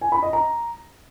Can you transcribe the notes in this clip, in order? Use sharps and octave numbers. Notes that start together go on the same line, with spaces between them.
G#5
B5
D#5
A#5